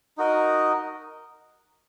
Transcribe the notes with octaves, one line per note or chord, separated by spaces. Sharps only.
D#4 F#4 A#4 D#5